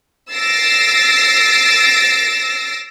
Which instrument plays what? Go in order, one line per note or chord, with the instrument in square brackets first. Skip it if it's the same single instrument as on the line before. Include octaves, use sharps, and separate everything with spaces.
[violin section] E6 A6 A#6 C7 D7